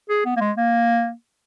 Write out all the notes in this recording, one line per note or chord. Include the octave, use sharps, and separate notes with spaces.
G#4
B3
A#3
G#3
A#3